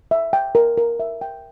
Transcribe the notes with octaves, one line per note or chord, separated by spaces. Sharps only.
E5
G5
A#4
A#4
E5
G5